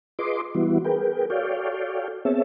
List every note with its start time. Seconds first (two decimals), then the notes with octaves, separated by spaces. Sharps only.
0.19 F4 G#4 B4 D#5 C6 D6
0.55 E3 G3 B3 E4 F#4
0.84 G#4 A#4 B4 G5
1.30 F#4 A4 C#5 D5 F5 G5
2.25 B3 C4 G#4 C#5 E5 A5